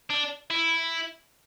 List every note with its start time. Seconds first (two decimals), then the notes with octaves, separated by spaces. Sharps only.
0.10 D4
0.50 E4